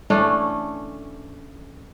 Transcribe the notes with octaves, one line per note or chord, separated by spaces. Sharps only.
E3 A3 C#4 D4